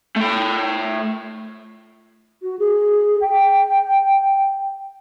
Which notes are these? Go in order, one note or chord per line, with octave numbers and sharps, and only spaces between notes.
A3 G5
F#4
G#4
G5